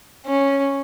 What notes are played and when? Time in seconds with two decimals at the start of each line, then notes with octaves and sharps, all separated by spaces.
0.26 C#4